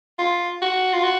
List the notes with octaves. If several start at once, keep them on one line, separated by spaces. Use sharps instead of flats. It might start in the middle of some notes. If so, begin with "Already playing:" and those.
F4
F#4
F4
F#4